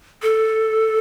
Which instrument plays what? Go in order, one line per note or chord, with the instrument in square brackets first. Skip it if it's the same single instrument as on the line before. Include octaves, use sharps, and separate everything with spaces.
[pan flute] A4